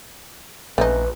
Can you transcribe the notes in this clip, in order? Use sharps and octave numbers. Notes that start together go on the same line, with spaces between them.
A#1 A3 C#4 D#4 B4